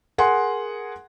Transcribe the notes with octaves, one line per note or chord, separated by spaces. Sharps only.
G#4 A#4 F#5 G#5 C6